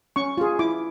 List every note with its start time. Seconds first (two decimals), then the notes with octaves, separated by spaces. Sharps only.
0.16 C#4 C#6
0.38 F4 G#4
0.59 E4 D6